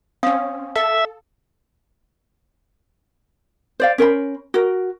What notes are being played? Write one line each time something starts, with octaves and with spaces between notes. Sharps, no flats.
C4 C#4 F5 D#6
A4 E5
C5 D5 F5
C#4 A#4 C5 B5
F#4 A#4